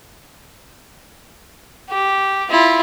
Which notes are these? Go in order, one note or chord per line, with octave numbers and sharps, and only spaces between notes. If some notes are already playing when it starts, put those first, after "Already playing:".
G4
E4 F4